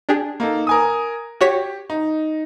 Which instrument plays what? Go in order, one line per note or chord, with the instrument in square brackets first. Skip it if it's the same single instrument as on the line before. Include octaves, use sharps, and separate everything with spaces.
[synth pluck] D4 G4 G#4
[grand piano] A#3 D#4 A4
A#4 G#5 D#6
[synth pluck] F#4 C#5 B6 [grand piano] G4
[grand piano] D#4